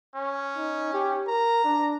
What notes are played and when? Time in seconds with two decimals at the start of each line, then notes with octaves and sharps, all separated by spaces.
0.15 C#4
0.57 D#4
0.94 G4
1.28 A#4 A#5
1.65 D4